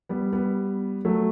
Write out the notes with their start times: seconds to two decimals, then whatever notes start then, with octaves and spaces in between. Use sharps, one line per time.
0.09 G3 B3
0.33 G3 B3
1.05 F#3 A3